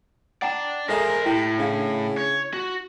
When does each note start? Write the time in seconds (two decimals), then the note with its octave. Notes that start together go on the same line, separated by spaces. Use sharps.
0.42 D5 F#5 G5 A5 A#5
0.89 G#3 A4 A#4 C5 E5 A#5
1.26 A2 E4 G4
1.58 C#3 D4 F5
2.17 C#5
2.53 F#4